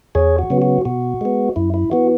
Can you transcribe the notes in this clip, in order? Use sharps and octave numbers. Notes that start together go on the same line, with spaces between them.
E2 G#4 C#5
F#4
C#3 F#3 B3
F#4
B2 F#4
G#3 B3
F#2 E4
E4
E3 B3 F#4